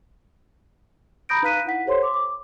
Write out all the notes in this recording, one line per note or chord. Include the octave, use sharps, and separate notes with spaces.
A#5 B5 D#6 G6 A#6 D7
D#4 B4 F5 F#6 B6 D#7
E4 F#5 B6
G4 A4 C5 C#5 C6
D6
D6